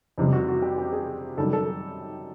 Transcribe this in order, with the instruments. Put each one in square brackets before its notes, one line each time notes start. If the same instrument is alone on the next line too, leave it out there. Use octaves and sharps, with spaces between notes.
[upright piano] F2 C3 E3 G3
F#4
F#4
G4
G4
G#4
F#2 D#3 G3 A4
A4